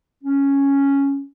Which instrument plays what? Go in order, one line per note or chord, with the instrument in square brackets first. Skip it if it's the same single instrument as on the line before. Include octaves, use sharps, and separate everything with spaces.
[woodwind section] C#4